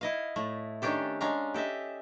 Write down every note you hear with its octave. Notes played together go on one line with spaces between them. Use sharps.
E4 D#5 F5
A2 A3
D#3 C#4 D4 G4 A4
G#3 C#4 D4 F5 A#5
G4 A4 D#5 E5